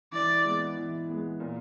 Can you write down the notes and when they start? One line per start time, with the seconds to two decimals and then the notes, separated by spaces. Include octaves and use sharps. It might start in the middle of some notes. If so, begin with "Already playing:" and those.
0.12 E3 D5
0.44 G#3 B3
0.77 E3
1.09 G#3 B3
1.40 A#2